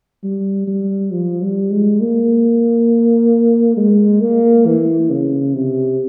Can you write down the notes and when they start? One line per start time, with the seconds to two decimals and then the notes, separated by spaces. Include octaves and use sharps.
0.24 G3
0.67 G3
1.12 F3
1.42 G3
1.71 G#3
2.00 A#3
3.77 G#3
4.21 A#3
4.66 E3
5.10 C#3
5.54 C3